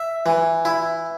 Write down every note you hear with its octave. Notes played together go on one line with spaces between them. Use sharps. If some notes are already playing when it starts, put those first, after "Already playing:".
Already playing: E5
E3
E4